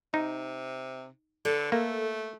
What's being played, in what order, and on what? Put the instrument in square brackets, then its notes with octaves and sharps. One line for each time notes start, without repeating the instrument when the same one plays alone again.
[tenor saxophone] C3 [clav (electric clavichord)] D#4
[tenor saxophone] D3 [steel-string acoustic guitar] A4 B4 C#5
[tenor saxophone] A3 [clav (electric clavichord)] A#3